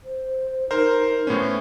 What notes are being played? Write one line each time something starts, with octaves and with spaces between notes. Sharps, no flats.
C5
D#4 A#4 C5
A2 B3 C#4 C5